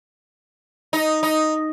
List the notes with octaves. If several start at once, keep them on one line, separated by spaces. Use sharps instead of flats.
D#4
D#4